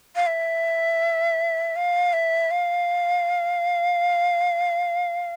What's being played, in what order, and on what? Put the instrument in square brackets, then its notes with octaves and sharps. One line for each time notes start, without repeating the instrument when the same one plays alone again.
[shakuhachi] F5
E5
F5
E5
F5